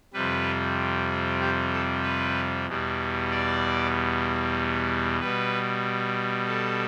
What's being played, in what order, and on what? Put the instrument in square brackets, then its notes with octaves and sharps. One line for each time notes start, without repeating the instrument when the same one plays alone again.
[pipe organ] F2 C3 G3 B4
G4
A4
B4
E2 B2 G3
D5
B2 G3 B4
A4